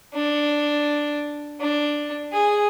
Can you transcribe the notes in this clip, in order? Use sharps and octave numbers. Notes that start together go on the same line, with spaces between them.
D4
D4
G#4